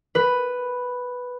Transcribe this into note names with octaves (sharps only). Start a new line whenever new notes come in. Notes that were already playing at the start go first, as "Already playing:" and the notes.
B4